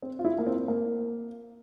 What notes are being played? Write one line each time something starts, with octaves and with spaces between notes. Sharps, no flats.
C4
F4
E4
A#3
C4
A#3